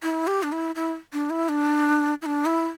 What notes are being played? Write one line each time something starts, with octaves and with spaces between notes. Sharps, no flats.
E4
G4
D4
E4
E4
D4
E4
D4
E4
D4
E4